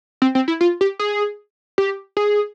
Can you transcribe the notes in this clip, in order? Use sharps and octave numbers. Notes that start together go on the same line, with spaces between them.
C4
C4
E4
F4
G4
G#4
G4
G#4